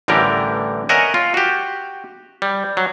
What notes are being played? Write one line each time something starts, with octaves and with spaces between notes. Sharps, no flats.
A1 D3 E3 G3 G4 A#4
A#4 C#5 D#5 E5 F#5 G#5
F4
F#4 G4
G3
F#3